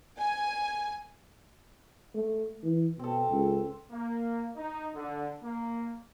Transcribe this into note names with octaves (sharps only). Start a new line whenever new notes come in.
G#5
A3
E3
B2 C4 A4
C#2
A#3
D#4
D3
A#3